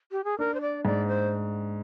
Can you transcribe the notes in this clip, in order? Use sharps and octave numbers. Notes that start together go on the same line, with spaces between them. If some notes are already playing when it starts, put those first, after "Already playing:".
G4
G#4
D4 A#4
C5
D5
G#2 D5
C5